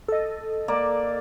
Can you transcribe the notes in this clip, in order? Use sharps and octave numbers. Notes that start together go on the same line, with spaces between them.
A4 D#5
A#3 D5